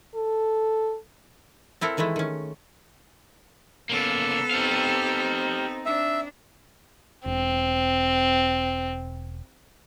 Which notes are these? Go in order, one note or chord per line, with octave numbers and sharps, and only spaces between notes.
A4
C4 E4 A4 A#4
D#3 E3 G#3 A3 E4
D#3 C#4
C#3 A#3 B3 A4
C4 D#4 G4 F5
D4 E5
E1 C4